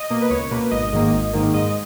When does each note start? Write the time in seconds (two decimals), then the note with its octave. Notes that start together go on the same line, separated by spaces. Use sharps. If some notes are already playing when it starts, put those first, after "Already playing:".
Already playing: D#5
0.10 B2 A#3
0.22 B4
0.30 C#2 C#5
0.51 B2 A#3 B4
0.71 G#1 D#5
0.92 G#2 D#3 A#3
1.13 G#1
1.33 G#2 D#3 A#3
1.54 G#2 D#5